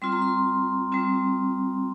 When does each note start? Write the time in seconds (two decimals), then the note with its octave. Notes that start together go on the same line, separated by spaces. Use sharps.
0.02 G3 C4 F4 C6
0.12 A#5
0.22 C6
0.92 G3 C4 F4